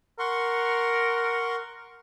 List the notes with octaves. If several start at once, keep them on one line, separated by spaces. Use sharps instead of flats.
A#4 F#5 C6 C#6